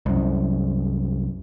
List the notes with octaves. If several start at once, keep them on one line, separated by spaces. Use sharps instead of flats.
C2 F#2